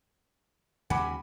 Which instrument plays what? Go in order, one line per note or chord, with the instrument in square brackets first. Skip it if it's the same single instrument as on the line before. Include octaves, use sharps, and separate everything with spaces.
[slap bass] D#2 C#3 G#3 [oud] F#4 [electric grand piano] G#5 B5 D6